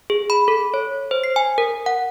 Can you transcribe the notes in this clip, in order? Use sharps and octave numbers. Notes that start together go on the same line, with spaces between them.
G#4
B5
A4
C#5
C5
C7
G#5
A#4
F#5